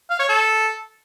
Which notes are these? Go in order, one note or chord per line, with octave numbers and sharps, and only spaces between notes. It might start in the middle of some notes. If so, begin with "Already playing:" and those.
F5
C#5
A4